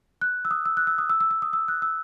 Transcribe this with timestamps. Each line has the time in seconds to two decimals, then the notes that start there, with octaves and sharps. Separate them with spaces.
0.21 F#6
0.45 E6
0.51 D#6
0.66 E6
0.77 F#6
0.87 E6
0.98 D#6
1.10 E6
1.21 E6
1.31 E6
1.42 D#6
1.53 E6
1.68 F#6
1.82 E6